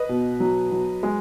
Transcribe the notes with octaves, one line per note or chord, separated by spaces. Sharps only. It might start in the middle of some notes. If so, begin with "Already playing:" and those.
Already playing: B4 D#5
B2
F#3
F#3
G#3